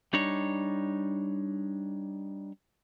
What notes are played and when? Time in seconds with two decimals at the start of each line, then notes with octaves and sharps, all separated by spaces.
0.13 G3 D4 D#4 C#5